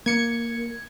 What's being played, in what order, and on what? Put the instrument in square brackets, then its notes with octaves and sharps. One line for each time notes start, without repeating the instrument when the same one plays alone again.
[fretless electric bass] A#3 [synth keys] G#6 C#7